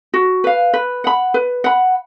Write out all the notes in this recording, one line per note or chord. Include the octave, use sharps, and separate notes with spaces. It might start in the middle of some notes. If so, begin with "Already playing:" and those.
F#4
B4 F5
B4
F#5 B5
B4
F#5 B5